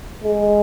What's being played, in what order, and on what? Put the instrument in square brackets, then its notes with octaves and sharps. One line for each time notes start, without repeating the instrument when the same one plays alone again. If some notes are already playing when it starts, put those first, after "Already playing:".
[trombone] G#3